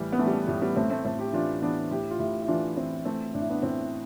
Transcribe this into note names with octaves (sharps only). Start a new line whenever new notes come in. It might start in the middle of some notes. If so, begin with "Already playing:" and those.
Already playing: A2 E3 G3
B3
E3 A3
G3
A3
A2 G3
G3 B3
A2 A3 C4
A3 C4
A2 A3 C4
E4 G4
E3 D4 F4
E3 B3 D4
A2 E4 G4
F4
A2 E4 G4
E4
E3 D4 F4
E3 C4 E4
E3 A3 C4
A2 D4
E4
B3 D4
A2 C4 E4